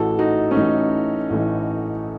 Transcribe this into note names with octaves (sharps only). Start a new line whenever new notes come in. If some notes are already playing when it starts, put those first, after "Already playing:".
Already playing: A1 A2 E3 F#4 A4
D#4 F#4
C#4
A1 A2 E3 D#4
A1 A2 E3